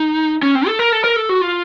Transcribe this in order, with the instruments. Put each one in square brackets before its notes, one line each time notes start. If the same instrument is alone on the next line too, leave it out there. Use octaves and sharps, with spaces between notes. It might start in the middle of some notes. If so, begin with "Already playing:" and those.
Already playing: [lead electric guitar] D#4
C#4
C4
A4
A#4
A4
A#4
A4
F#4
F4